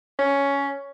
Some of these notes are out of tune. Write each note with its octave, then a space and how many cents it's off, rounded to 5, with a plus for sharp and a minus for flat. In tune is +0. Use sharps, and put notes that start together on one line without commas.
C#4 +10